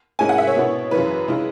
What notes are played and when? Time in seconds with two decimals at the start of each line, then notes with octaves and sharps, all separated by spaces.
0.19 G#2 G#3 C#4 E4 G#5
0.29 F#5
0.38 E5
0.47 C#5
0.55 B2 B3 E4
0.91 F#2 C#3 E3 B4
1.28 C#3 G#3 E4